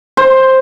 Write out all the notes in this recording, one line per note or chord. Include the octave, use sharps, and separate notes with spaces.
C5